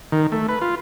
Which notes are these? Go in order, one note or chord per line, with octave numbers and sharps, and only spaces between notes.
D#3
A3
B4
F4